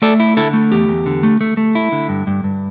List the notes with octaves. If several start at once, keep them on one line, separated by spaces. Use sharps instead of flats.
A3 A4 D5
E4
D3 E4 A4
A3
E2 G4
E2
D3
A3
A3
A3
E4
D3
G2
G2
G2